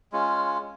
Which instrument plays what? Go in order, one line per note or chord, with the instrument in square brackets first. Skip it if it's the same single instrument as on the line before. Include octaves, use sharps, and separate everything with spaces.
[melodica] G#3 C#4 F4